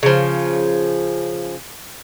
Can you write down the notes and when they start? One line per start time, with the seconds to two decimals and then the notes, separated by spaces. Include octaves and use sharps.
0.03 C#3 F3